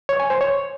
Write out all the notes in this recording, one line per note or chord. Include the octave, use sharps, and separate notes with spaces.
C#5
G#5
C5
C#5